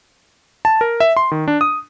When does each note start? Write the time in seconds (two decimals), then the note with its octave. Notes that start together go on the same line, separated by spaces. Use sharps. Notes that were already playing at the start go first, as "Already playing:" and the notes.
0.65 A5
0.81 A#4
1.00 E5
1.17 C6
1.32 D#3
1.48 D4
1.61 D#6